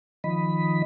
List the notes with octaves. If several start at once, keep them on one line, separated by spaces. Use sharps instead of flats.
D#3 F3 D#5 B5